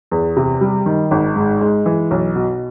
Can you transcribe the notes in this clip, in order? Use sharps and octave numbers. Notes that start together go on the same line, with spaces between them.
E2
C3
G3
D#3
G#1
G#2
G#3
E3
B1
B2